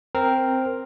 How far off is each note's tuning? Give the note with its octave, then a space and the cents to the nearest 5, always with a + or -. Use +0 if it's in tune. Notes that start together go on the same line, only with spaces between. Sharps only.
C4 +0 A#4 +0